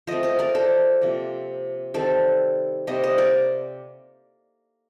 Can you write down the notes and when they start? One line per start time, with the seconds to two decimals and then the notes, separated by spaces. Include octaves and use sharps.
0.07 F3 A3 C4 C5 D#5
0.23 C5 D#5
0.39 A#4 D5
0.55 A4 C5
1.01 C3 F3 A#3
1.94 D#3 G3 C4 A4 C5
2.87 C3 G3 A#3 C5 D#5
3.03 C5 D#5
3.18 A#4 D5